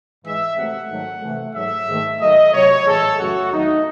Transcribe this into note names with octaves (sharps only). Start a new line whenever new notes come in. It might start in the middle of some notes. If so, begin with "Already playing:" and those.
G#2 E3 G#3 E5
C3 F#3 A3 F#5
G#2 D#3 F#3 A3
C3 E3 A3
G#2 F#3 A3 E5
G#2 D#3 A3
G#2 D#3 F#3 A3 D#5
C3 F#3 A3 C#5
A2 E3 G#3 A4
F#2 C#3 F#3 A3 F#4
E2 D#3 F#3 A3 D#4